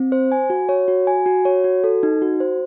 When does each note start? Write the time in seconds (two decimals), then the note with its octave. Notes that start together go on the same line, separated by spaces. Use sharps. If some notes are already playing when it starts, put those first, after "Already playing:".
Already playing: C4
0.12 C5
0.32 G#5
0.50 F#4
0.69 C#5
0.88 F#4
1.07 G#5
1.26 F#4
1.45 C#5
1.64 F#4
1.84 A4
2.03 D#4
2.22 F#4
2.40 C5